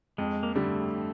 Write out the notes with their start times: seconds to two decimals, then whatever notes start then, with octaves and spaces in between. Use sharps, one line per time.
0.18 F2 G#3
0.43 A#3
0.55 D3 G3 A3